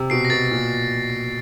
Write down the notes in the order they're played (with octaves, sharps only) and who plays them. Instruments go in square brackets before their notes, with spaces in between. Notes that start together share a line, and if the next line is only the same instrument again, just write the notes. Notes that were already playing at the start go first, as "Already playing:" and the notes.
Already playing: [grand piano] C3
[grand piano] B2 [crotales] C7 D7
[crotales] A#6
[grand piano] B2 [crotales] A6
[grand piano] A#2